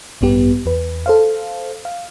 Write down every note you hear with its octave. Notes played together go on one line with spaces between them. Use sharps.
A1 G2 B3 G4
E2 B4
A4 C5 F5
F5